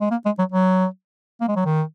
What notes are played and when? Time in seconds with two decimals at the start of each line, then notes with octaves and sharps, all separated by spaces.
0.01 G#3
0.11 A#3
0.25 G#3
0.39 F#3
0.52 F#3
1.41 A#3
1.48 G#3
1.56 F#3
1.65 D#3